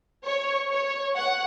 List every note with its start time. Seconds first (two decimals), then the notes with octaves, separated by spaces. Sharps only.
0.24 C#5
0.70 C#5
1.16 F#5